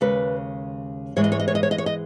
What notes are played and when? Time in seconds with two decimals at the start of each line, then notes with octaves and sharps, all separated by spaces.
0.01 D#2 C#3 G#3 B4
1.16 G#2 E3 G#3 C#5
1.24 D#5
1.32 C#5
1.40 D#5
1.48 C#5
1.55 D#5
1.63 C#5
1.71 D#5
1.78 C#5
1.86 D#5